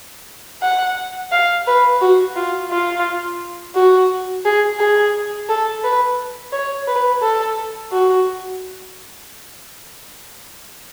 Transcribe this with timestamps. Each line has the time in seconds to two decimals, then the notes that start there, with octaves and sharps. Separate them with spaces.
0.62 F#5
1.32 F5
1.67 B4
2.01 F#4
2.36 F4
2.71 F4
3.75 F#4
4.45 G#4
4.80 G#4
5.49 A4
5.84 B4
6.52 C#5
6.88 B4
7.22 A4
7.92 F#4